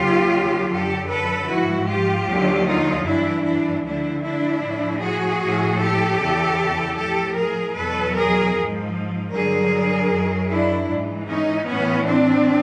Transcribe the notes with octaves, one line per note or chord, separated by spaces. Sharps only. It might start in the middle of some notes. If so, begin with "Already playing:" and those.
Already playing: D#2 C#3 F#3 F4 G4
F#2 D3 F#3 G4 A4
A4 B4
G#2 F3 E4 F#4
F4 G4
D#2 D3 F#3
D#4 F4
G2 E3 D4 E4
D4 E4
D2 D3 F3 D4 E4
D4 E4
A2 F3
F#4 G#4
A2 F3
G4 A4
E2 C#3 E3
A2 F3 G4 A4
G#4 A#4
E2 B2 F#3 A4 B4
G#4 A#4
G#2 F3
G2 D3 F#3 G#4 A#4
F#2 D#3 F#3
D4 E4
G#2 E3
C#4 D#4
A2 E3 B3 C#4
C4 D4